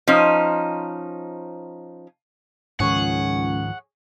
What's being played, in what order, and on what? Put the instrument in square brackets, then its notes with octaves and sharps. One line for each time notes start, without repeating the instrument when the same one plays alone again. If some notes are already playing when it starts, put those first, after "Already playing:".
[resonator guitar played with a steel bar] F3 C#4 D#4 C5
[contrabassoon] C#2 [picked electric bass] G#2 D#3 F3 [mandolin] G#4 C#5 [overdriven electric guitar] F#5